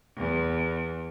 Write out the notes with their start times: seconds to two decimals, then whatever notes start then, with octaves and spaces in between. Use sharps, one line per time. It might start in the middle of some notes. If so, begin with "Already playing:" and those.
0.18 E2